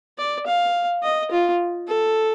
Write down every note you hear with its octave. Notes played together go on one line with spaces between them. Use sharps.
D5
F5
D#5
F4
A4